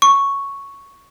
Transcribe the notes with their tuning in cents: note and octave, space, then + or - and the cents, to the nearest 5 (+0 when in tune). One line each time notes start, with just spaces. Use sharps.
C#6 +0